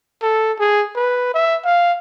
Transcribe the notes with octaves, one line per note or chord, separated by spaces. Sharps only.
A4
G#4
B4
E5
F5